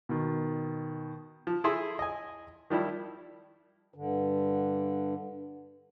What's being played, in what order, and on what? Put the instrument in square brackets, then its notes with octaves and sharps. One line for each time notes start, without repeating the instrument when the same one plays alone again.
[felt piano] B2 D#3
[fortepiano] F3
E4 G#4 A4 C6 E6
D#5 G#5
D#3 F3 G3 E4
[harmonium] G2 D3